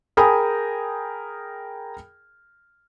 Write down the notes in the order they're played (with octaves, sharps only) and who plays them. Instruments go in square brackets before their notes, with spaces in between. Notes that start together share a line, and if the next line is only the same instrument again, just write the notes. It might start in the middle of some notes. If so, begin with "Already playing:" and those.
[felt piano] G#4 A#4 G5 G#5 B5 D#6